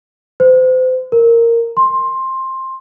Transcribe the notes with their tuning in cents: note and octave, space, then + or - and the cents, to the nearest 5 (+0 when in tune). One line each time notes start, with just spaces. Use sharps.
C5 -35
A#4 -10
C6 +15